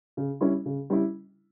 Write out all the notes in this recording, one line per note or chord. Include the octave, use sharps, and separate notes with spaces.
C#3
G3 C#4 E4
C#3
G3 C#4 E4